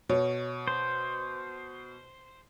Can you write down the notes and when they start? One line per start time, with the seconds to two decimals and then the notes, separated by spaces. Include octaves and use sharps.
0.09 B2 C#5
0.68 C5